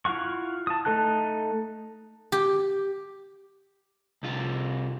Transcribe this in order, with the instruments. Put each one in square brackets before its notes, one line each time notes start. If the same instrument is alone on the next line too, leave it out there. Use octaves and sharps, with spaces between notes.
[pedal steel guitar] E4 F4 F5 F#5 C#6
A5 D#6
A3 D#4 A4 A5 F#6
[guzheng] G4
[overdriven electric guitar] C2 F4